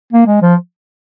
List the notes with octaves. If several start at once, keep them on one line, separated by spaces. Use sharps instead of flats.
A#3
G#3
F3